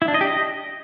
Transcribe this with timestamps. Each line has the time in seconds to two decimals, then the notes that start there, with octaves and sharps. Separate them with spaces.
0.02 E4
0.08 D4
0.14 D#5
0.21 G4
0.27 D#5